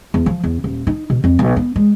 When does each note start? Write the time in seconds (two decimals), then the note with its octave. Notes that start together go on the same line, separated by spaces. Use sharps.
0.14 E2
0.26 F3
0.44 E2
0.64 D#1
0.87 D#4
1.10 B2
1.24 F2
1.39 B1
1.56 B3
1.76 G#3